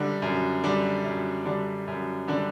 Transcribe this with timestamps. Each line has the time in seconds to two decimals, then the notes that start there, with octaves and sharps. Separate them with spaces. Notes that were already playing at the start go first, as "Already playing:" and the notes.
Already playing: F#2 D3 G3 D4
0.22 F#2
0.64 D3 G3 D4
1.04 F#2
1.45 D3 G3 D4
1.87 F#2
2.28 D3 G3 D4